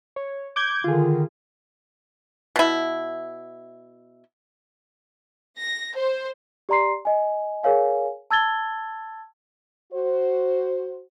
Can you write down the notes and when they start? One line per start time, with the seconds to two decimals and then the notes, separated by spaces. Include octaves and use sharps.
0.16 C#5
0.56 D6 G6 G#6
0.84 D3 D#3 F4 G#4
2.56 B2 E4
5.57 A#6
5.96 C5
6.69 G4 D5 A#5 C6 C7
7.05 D#5 G#5
7.63 G#4 A#4 C#5 F5 G#5
8.31 A5 E6 G#6 A6 G7
9.93 F#4 C5